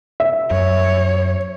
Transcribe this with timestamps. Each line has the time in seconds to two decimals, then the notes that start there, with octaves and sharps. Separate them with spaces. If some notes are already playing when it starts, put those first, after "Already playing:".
0.20 E5
0.51 F#2 C#5